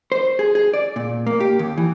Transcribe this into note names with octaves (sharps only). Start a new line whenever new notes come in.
C5
G#4
G#4
D5
A#2
A#3
G4
D#2
E3